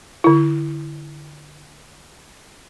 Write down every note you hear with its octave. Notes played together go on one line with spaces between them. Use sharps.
D3 E4